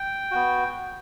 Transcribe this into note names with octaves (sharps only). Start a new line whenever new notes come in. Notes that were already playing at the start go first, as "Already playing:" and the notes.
Already playing: G5
B3 F#4